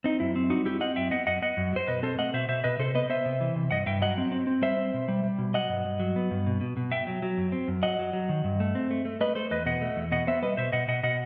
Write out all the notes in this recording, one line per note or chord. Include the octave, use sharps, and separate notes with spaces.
C4 D#4
F#2 E4
C4
G3 D#4 F#4
C4 E4 G4
C4 D#5 F#5
F#2 E5 G5
B3 D#5 F#5
F#2 D#5 F#5
B3 D#5 F#5
F#2
F#3 C5
B2 B4 D#5
C4 A4 C5
A3 D#5 F#5
B2 C5 E5
B2 C5 E5
B2 B4 D#5
C3 A4 C5
B3 B4 D#5
B3 C5 E5
C3
E3
C3
G2 D#5 F#5
G2 E5 G5
F#3 D#5 F#5
C4
C4
C4
G3 C5 E5
C4
B2
G3
G3
B2
F#3 D#5 F#5
G2
G2
F#3
B3
G2
B2
B2
B2
B3 E5 G5
F#3
F#3
F#2
C4
F#2
F#3 D#5 F#5
F#3
F#3
D#3
G2
A3
C4
A3
A3
A3 B4 D#5
A3 A4 C5
E2 B4 D#5
B2 D#5 F#5
A3
E2
B2 D#5 F#5
B3 C5 E5
G3 B4 D#5
B2 C5 E5
B2 D#5 F#5
B2 D#5 F#5
B2 D#5 F#5